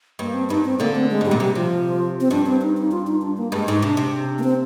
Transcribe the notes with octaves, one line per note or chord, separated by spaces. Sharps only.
G2 A#3
C4
G2 D#4
C4
D2 D3 A#3
C4
G#3
G#2 G3
A#2
C3 G3
C3 F3
C4
G2 D4
C4
D#4
D#4
F4
D#4
D4
A#3
G2 G#3
G#2 D#4
C3 D4
C3
A#3
C4